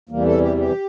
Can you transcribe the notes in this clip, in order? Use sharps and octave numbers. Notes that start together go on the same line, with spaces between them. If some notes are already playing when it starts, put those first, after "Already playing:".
E2 C3 E3 G3 A#3
A4
G4
G4